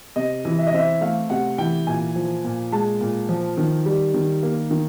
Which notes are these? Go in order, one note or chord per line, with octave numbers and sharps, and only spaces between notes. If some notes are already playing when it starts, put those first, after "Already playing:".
C3 D#5
E3
E5
D#5
C4 E5
A3 F5
C3 F#5
E3 G5
A#2 G#5
F3
A#2
G#3 A5
A#2
F3
D#3
G3
D#3
A#3
D#3